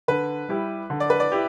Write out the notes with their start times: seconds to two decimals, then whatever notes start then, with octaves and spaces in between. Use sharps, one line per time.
0.08 D3 B4
0.49 G3 E4 G4
0.90 D3
1.00 D5
1.10 B4
1.20 D5
1.32 E4 G4